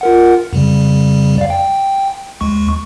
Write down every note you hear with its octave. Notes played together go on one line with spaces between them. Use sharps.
F4 A#4 F#5
F2 C#3 G3
D5 F5
G5
D#2 G#3 C#6